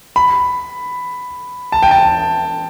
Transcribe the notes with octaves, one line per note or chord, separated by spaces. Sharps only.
B5
A5
G5
A5